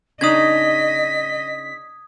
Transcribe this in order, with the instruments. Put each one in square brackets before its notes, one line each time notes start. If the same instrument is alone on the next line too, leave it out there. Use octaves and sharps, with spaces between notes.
[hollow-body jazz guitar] C#3 D4 D#4 [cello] D#5 [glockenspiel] D#6 G#6 [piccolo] B6